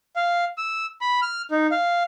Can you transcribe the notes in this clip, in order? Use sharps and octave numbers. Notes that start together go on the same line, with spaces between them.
F5
E6
B5
F6
D#4
F5